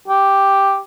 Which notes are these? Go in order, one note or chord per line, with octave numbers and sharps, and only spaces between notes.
G4